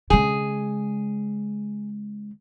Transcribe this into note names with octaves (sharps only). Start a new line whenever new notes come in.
C#3 G#3 G#4